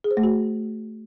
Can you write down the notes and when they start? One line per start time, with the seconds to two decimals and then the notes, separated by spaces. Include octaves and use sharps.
0.04 G#4
0.11 C5
0.17 A3
0.23 F#4